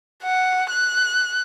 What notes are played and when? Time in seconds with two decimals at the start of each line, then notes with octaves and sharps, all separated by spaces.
0.23 F#5
0.71 F#6